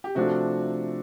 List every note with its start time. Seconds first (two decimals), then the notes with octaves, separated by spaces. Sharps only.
0.04 G4
0.15 C3 F3 A3 D4 F#4